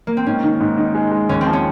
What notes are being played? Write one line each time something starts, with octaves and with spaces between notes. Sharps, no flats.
A#3
C4
G#2 C#4
D#3
G#2
D#3
G#3
G#3
D#2 C#4
C4
F3
C#4